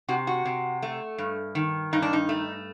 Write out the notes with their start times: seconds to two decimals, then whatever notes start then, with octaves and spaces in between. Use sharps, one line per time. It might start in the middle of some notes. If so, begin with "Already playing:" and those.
0.08 C3 F#4
0.27 F#4
0.45 C3
0.82 A3
1.18 G2
1.55 D#3
1.93 G2 D#4
2.02 D4
2.13 D#4
2.29 A3